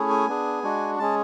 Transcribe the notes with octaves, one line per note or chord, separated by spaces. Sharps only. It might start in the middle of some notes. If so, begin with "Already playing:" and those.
Already playing: A3 C#4 E4 G#4
G#5
B3 D4 G#4
G#3 D4 F#4
G#3 C#4 G#4 A5